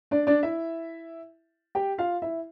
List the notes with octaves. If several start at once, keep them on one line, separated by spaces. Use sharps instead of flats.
D4 D5
D4 D5
E4 E5
G4 G5
F4 F5
E4 E5